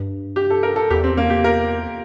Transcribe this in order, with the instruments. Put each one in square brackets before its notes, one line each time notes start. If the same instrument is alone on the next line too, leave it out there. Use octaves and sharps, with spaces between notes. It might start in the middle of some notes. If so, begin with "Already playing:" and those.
Already playing: [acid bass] G2
[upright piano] G4
A4
A#4
A4
[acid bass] E2 [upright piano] G4
[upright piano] C4
A#3
G4
A#4